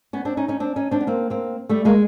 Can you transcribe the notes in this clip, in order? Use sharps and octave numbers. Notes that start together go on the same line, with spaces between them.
B3 C#4
C4 D4
C#4 D#4
C#4 D#4
C4 D4
C#4 D#4
C4 D4
B3
A#3 C4
A#3 C4
G3 A3
G#3 A#3